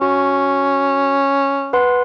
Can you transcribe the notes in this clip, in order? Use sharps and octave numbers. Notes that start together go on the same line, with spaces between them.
C#4 F#4
B4 F#5 C6